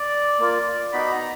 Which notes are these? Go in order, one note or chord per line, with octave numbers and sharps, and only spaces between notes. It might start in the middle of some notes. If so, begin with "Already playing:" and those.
Already playing: D5
A#3 F4
B3 D#4 F#4 B5
A#5